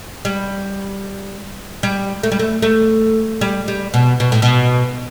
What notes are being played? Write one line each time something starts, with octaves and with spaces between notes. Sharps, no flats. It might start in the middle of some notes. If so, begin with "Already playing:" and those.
G3
G3
A3
G3
A3
A3
G3
G3
B2
B2
A2
B2